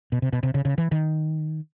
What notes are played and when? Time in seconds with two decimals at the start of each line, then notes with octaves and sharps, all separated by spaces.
0.12 B2
0.22 C3
0.33 B2
0.43 C3
0.54 C#3
0.65 C#3
0.78 E3
0.92 D#3